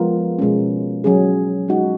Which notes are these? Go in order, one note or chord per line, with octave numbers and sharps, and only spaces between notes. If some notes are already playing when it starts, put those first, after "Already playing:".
Already playing: F3 G#3 B3 F4 A#4
B2 G#3 C#4
F#3 C#4 G#4
G#3 D#4 F#4